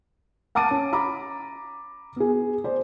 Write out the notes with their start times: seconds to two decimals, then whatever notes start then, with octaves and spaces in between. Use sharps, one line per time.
0.55 F#5 A5 D6 A6 D7 D#7
0.71 C#4
0.93 A#5 B5 D6
2.16 B3 G#4
2.64 C5 D5